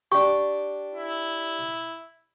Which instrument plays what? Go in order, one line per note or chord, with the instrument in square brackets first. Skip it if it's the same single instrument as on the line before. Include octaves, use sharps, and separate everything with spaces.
[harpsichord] D4 G4 [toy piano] C#6
[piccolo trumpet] E4